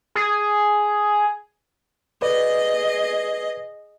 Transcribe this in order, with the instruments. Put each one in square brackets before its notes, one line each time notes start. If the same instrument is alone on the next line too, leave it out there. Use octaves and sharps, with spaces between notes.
[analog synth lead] G#4
[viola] G#4 D#5 [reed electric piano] B4 D5